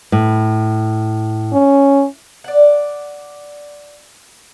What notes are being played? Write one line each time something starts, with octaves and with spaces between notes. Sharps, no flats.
A2
C#4
D5 F#5